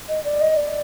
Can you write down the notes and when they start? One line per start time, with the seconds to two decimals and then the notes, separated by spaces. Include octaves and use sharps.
0.09 D#5
0.24 D5
0.41 D#5
0.57 D5